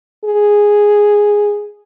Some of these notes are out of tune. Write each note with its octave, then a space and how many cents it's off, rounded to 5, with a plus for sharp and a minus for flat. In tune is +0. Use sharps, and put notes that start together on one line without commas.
G#4 -5